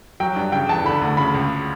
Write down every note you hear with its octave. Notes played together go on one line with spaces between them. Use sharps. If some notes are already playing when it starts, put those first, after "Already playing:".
F#3 G5
G2
C#3 G5
E2 A5
D3 B5
D2
C#3 B5
C#2